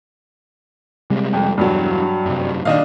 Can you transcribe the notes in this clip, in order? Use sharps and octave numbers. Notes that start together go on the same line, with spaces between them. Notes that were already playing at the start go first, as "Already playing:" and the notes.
C3 G3 G#3
F2
E1 G2 F#3
F#2 C3
A#2 D#3 D4 D#5 F5